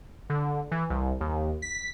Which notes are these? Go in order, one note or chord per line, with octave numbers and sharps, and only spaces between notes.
D3
E3
C2
D#2
B6